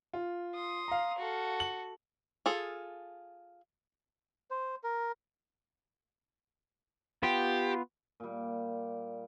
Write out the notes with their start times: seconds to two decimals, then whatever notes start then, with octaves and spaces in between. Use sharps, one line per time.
0.13 F4
0.55 C6 D#6
0.88 F5 A#5
1.18 F#4 A4
1.60 F#7
2.46 F4 G#4 A4
4.51 C5
4.83 A#4
7.23 B3 F4 G4
8.20 A#2 G3